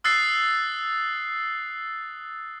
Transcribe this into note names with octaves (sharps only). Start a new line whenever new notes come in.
D#6 E6 F#6 A6 C7